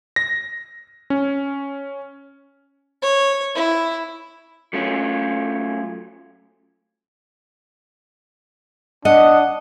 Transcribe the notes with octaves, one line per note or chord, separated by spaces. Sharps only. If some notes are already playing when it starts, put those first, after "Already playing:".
A#6
C#4
C#5
E4
F#3 A3 C#4 F4
D4 D#5 F#5